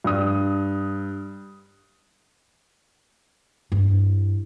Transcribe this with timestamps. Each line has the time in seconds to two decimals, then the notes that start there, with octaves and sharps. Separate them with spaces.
0.04 G2 D#6
3.72 G2 E3